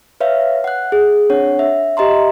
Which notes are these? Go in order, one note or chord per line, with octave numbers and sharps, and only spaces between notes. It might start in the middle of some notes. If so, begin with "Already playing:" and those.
B4 C#5 E5 F5
F#5 F#6
G#4
C4 D4 C#5 F#5
E5
G4 D#5 E5 A#5 C6